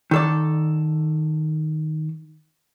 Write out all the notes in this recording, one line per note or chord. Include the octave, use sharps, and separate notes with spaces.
D#3 A4 D5